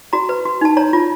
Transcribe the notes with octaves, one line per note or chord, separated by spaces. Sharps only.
F#4 A#5
B4
F#4
D#4 A5
C#5 A#5
F4